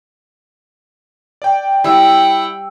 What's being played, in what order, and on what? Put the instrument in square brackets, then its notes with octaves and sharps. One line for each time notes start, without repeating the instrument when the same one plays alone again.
[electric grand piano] D5 G5
[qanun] G3 [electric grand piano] E4 E6 [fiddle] F#5 G5